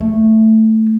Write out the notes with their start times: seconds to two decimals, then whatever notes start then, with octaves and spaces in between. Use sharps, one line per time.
0.01 A3